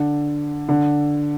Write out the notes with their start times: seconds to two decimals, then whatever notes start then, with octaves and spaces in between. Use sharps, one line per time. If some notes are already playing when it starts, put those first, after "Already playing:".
Already playing: D3
0.69 D3